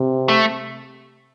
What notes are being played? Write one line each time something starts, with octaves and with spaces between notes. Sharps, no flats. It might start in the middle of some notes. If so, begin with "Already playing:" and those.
Already playing: C3
A3